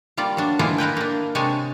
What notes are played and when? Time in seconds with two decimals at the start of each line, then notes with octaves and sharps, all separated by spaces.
0.17 G3 A#3 F4 D5
0.37 F#3 D4
0.59 E3 G#3 A#3 D4 E4 F4
0.78 E4 A#4 B4 G5
0.97 A#3 D4
1.35 C3 G#3 D4 C#5 G#5 A5